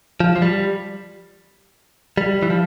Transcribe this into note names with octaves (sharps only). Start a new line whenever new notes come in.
F3
F3
G3
G3
E3
F3